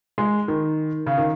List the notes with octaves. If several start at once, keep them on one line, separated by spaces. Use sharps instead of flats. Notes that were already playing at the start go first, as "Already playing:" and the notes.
G#3
D#3
C#3
D#3